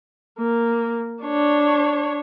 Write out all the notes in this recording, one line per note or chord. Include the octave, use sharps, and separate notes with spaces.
A#3
D4 C#5